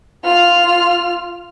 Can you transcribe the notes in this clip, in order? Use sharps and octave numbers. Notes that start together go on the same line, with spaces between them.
F4 F6